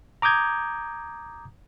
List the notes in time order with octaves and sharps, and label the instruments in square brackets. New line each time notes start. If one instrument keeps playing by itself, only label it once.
[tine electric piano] A#5 D6 D#6 G6 G#6